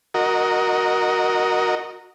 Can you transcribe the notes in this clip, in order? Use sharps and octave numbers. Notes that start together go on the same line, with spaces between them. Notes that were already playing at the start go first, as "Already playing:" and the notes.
F#4 A#4 D#5